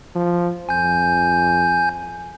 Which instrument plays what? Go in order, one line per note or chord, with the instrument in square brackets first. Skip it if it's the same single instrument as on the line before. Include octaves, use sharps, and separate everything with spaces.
[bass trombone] F3
[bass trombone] F2 [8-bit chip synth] G#5 G6